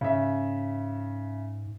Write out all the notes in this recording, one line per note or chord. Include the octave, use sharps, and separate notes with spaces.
G#2 C#3 E5